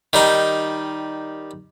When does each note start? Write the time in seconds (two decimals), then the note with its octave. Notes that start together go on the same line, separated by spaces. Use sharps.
0.13 D#3 G3 D#4